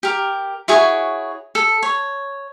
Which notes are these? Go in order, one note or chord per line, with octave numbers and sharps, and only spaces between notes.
G4 A#4
E4 F#4 G#4 C#5
A4
C#5